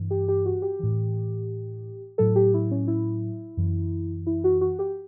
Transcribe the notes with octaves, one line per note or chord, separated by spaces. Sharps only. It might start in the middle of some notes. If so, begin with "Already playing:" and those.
Already playing: G2 E3
G4
G4
F#4
G4
A2 E3
A2 F#3 A4
G4
E4
C#4
E4
F#2 E3
E4
F#4
F#4
G4